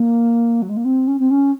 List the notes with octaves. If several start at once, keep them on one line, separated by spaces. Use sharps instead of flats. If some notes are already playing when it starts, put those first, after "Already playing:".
Already playing: A#3
F#3
G#3
A#3
C4
C#4
C4
C#4